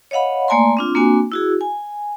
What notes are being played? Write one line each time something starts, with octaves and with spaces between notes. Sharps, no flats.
C#5 D#5 F5 F#5 B5
A3 A#3 D5 G#5 A#5 C6
C4 D4 F4
A#3 C4 D4 F#4 G#5
E4 F#4 G#4
G#5